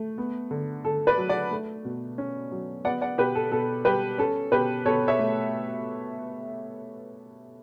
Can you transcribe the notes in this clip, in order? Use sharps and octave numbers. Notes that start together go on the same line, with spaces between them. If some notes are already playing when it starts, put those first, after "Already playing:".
Already playing: A3
B3
D3
D3 A4
B4 D5
F#3
D5 F#5
A3
B2
C#4
F#3
B3 D5 F#5
D5 F#5
B2 G4 B4
A4
B2 A4
G3 G4 B4
C#4 A4
B2 G4 B4
B2 A4 C#5
C#5 E5
A3